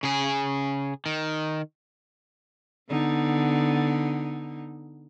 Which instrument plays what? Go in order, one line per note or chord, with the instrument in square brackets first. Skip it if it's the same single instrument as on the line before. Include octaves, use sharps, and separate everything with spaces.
[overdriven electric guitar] C#3 G#4
D#3
[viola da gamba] D3 B3 D#4